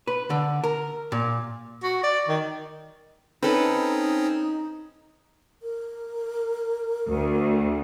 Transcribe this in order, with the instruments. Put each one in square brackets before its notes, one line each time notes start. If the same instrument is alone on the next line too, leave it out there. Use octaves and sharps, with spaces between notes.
[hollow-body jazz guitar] B4
D3
A#4
A#2
[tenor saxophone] F#4
D5
D#3
[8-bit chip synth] C4 C#4 [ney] D#4 [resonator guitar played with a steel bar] A4 B4
[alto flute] A#4
[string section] D2